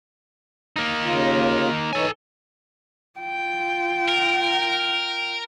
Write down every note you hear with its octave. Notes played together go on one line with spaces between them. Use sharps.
A#3 D#4
D#2 C#3 F4
E3 D#4 A4 C#5 G#5
F4 G5
A#4